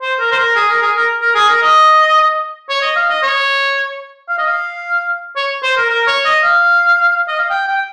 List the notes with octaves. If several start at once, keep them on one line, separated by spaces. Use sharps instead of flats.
C5
A#4
C5
A#4
G#4
A#4
G#4
A#4
A#4
G#4
A#4
D#5
C#5
D#5
F5
D#5
C#5
F5
D#5
F5
C#5
C5
A#4
A#4
C#5
D#5
F5
D#5
F5
G5
G5